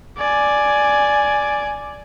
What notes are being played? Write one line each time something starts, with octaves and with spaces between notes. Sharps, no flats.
D5 G#5